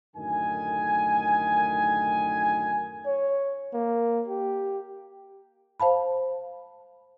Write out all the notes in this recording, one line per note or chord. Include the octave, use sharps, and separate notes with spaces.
F#2 A2 D3 D#3 G#5
C#5
A#3
G4
C5 F5 A5 B5